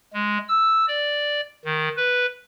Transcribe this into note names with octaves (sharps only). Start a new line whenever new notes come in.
G#3
E6
D5
D#3
B4